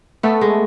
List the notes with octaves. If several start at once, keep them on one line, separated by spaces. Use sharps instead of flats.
A3 B3
G#3